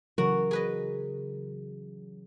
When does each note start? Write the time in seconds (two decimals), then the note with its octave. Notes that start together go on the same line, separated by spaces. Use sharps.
0.18 C#3 E3 F#3 F#4 A#4
0.51 G#4 B4 D#5